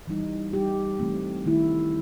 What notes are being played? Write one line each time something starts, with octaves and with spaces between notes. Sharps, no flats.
E3 G3 D#4
G3 D#4 G4
C3 E3 A3 C4
D#3 A3 E4